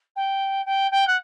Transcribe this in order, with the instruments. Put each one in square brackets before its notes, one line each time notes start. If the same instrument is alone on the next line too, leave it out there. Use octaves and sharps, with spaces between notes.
[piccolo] G5
G5
G5
F#5